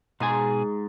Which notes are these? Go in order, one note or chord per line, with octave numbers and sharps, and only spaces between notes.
G#2 B2 G#4 G#5